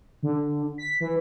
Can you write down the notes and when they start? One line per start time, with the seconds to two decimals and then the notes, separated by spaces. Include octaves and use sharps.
0.23 D3
0.78 B6
1.00 E3